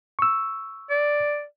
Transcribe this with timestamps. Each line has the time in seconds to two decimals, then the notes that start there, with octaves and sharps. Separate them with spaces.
0.19 C#6 E6
0.90 D5